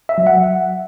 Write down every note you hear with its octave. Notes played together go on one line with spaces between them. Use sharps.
E5
F#3
F#5